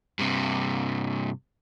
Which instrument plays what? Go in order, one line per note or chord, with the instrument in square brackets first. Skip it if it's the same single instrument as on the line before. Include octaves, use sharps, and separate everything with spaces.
[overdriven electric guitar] G2 C3